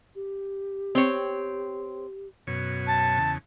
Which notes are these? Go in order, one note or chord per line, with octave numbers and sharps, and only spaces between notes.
G4
C4 C#5
F#2 B2 C#5
A5
E2 C#3